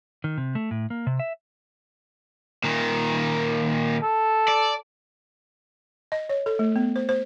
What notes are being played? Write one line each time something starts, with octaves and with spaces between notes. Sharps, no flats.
D#3
C3
A3
A2
A#3
C3
E5
A#2 D#3
A4
D5
D#5
C#5
A4
A3
B3
C5
C5